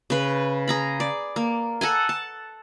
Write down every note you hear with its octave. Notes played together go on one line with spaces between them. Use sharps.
C#3 B4
G#4 A#5 B5
D5
A#3
A4 F#5 G#5
A5